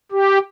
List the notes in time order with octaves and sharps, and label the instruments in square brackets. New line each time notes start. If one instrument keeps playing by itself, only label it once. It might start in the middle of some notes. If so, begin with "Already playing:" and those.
[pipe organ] G4